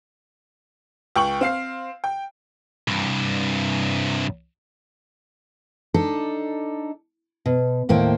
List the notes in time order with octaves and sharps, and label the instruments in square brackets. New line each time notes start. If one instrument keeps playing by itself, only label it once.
[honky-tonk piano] C#2 G5 C#6 F#7
C4 F5 C7
G5
[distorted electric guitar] C2 G2
[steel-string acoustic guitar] D4 D#4 A4
B2
D#2 A2 A#3 C5 G5